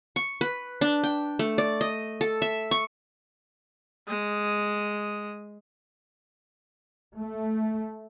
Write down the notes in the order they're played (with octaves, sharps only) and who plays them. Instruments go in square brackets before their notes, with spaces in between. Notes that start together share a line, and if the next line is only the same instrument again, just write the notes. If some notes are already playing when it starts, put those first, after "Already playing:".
[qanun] C#6
B4
D4
G5
A3
D5
D#5
A4
E5
C#6
[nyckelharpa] G#3 D#6
[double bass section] A3